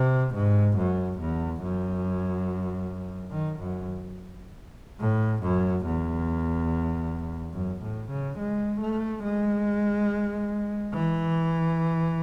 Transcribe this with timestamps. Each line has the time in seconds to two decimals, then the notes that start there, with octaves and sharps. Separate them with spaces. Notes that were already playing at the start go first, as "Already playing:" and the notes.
Already playing: C3
0.34 G#2
0.78 F#2
1.20 E2
1.62 F#2
3.31 D#3
3.59 F#2
5.00 A2
5.43 F#2
5.85 E2
7.54 F#2
7.82 A2
8.11 C#3
8.39 G#3
8.81 A3
9.23 G#3
10.93 E3